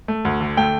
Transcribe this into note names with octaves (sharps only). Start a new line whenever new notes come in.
A3
D2
D3
A3 G5